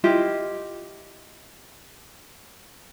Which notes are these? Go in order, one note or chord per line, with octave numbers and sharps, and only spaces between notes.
E4 F4 G4 D#5